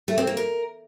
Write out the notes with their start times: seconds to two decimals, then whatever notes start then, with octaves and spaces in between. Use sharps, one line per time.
0.08 A3
0.18 C4
0.27 A#3
0.37 A#4